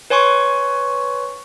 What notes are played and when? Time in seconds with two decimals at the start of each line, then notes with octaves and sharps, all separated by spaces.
0.10 B4 C#5 G#5 C6 C#6